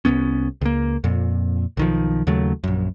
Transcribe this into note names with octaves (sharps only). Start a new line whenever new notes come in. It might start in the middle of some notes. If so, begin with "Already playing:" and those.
C2 A2 B3 C#4
C#2 A#3
F2 A#2
B1 D#3 F3
D#2 C#3 F#3 A3
A#1 F#2